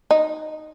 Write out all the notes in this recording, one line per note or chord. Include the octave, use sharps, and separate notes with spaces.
D#4